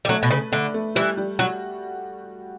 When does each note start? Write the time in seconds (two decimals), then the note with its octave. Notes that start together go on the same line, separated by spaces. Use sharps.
0.05 G3
0.09 F#3 A3
0.23 B2
0.31 C#3 B4
0.52 D3 A3
0.74 A3
0.95 E3 G3
1.17 G3
1.39 F#3 F#4